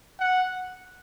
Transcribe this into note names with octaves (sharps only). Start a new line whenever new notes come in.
F#5